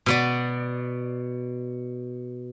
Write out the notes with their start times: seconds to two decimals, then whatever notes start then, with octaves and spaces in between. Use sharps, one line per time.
0.06 B2 B3 D5